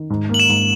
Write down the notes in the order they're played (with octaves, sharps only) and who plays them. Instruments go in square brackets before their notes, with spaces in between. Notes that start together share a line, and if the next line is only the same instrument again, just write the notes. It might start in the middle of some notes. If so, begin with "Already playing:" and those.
Already playing: [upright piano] D#3
G#2
A#3
[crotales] F#7
E7
[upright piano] G#2